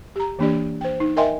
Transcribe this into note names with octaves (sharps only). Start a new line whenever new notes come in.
G4 A#5
E3 A#3 D4 G4 D5
C5 G5
D#4
A#4 D#5 E5 G5 G#5 C6